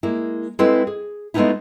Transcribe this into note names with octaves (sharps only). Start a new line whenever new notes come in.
G#3 A#3 E4
G#3 C4 E4 A4 B4 F5
G#4
G#3 A3 B3 C#4 D#4 E4